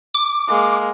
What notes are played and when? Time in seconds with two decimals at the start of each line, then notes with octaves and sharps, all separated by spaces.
0.15 D6
0.48 G#3 A#3